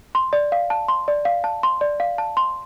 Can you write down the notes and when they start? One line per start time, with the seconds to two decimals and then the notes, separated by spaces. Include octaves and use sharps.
0.15 C6
0.33 D5
0.52 F5
0.70 A5
0.88 C6
1.08 D5
1.25 F5
1.44 A5
1.63 C6
1.81 D5
2.00 F5
2.18 A5
2.37 C6